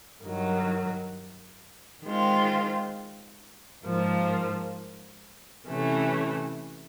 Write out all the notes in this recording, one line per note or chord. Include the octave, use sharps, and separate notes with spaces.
G2 D#3 F#3
D#3 G#3 C4 F4
G#2 F3 A#3
C3 E3 A3 C#4